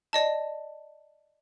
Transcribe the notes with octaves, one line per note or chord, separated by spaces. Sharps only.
D5 D#5 A5